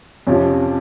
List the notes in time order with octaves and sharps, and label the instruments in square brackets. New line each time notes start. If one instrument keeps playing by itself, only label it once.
[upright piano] F2 C3 F3 C#4